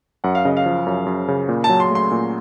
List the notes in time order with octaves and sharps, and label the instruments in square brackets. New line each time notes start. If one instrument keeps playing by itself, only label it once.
[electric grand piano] F#2 [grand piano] F#5
[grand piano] F5
[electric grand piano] C#3 [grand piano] D#5
[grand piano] F5
[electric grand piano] F3
F#2
F#2
C#3
A#2
[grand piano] A5
[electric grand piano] F#3
[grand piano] C6
[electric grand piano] A3 [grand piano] C6
[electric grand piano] A#2